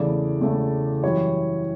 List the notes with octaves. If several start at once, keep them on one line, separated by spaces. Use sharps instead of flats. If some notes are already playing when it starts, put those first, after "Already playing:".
Already playing: E2 C#3 E3 A3 D5
E2 C#3 E3 A3
F#2 E3 G3 C#5